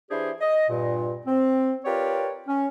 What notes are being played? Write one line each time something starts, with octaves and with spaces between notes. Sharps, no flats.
E3 D4 E4 G4 G#4 C5
D#5
G2 A#2
C4
F4 G4 A#4 B4 C#5 D5
C#4